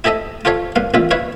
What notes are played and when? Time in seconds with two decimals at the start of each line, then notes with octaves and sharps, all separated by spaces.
0.04 E4 G4 A4 D#5 E5
0.45 F4 G4 A4 C#5 F5
0.76 G2 A#3 F5
0.94 A1 A#2 F4 E5
1.11 E4 B4 C#5 F5